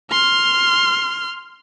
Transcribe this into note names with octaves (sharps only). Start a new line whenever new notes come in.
C6 F6